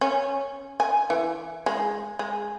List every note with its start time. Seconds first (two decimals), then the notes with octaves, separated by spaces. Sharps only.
0.01 C#4
0.80 G#5
1.10 E3
1.66 G#3
2.19 G#3